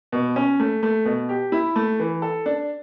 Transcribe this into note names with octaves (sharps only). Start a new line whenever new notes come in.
B2
C#4
A3
A3
B2
G4
E4
A3
E3
A4
D4